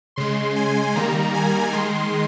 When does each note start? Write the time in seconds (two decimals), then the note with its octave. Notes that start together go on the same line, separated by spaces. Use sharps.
0.16 C#3 G#3 C6
0.56 G#5
0.95 D#3 G3 A#3 A#5
1.34 G#5
1.73 D#3 G#3 C6